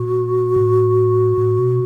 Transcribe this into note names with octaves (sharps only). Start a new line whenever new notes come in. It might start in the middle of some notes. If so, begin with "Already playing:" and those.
Already playing: A#2 F#4
A2
A2
B2